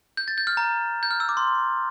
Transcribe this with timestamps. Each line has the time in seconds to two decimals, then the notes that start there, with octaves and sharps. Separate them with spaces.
0.17 G6
0.28 A6
0.38 G6
0.47 F6
0.57 A#5
1.03 G6
1.11 F6
1.20 E6
1.29 D6
1.37 C6